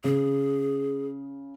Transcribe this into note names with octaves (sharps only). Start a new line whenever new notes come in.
C#3 G#4